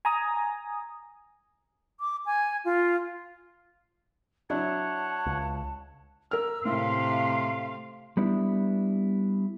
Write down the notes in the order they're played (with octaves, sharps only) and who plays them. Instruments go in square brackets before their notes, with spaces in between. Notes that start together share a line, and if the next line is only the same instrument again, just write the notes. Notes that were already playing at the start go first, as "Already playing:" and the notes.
[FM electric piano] G#5 A#5 D#6
[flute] D6
G#5
F4
[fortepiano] F#3 D4 E4 [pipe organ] C#5 F#5 [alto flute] A5
[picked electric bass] C#2
[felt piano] A#4 F6 [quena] E6
[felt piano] A2 [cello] C3 A3 [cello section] F5 [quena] C6
[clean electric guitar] G3 B3 D4 E4